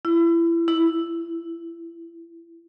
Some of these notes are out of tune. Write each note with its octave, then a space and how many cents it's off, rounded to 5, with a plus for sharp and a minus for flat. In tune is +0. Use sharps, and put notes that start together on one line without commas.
E4 +30
E4 +0